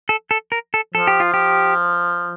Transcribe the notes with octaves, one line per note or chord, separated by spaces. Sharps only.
A4
A4
A#4
A4
F3 A4
G4
F4
G4